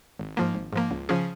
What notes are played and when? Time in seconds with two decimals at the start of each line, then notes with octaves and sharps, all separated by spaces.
0.19 G#1
0.37 G#2 F3 A#3
0.55 G#1
0.73 G#2 F3 A#3
0.91 C#2
1.09 C#3 F3 C#4 G#4